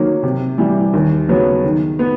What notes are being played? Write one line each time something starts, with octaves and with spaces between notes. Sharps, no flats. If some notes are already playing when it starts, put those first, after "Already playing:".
Already playing: D#3 F#3 A#3 D#4
C3
E3 G3
D#2
C#3 F#3 B3
D#3
B3